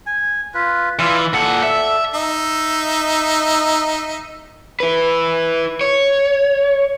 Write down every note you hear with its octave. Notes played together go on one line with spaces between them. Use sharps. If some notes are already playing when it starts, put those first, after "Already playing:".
G#5
F4 B4
E3 F4 D5 E6
A#2 A4 D5 F#5
E5
D#4 E5
E4 B4
C#5